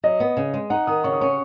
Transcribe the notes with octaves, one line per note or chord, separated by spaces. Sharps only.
F#3 D#5
B3
C#3
G#3
D#4 F#5
D#3 D#6
C#3 C#6
D#6
C#4 C#6